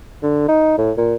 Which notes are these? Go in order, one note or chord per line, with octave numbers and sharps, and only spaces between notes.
D3
D#4
A2
A#2